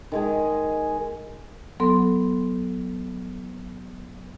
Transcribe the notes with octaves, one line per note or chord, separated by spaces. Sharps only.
D#3 G#3 G#4
F#3 B3 A4 C6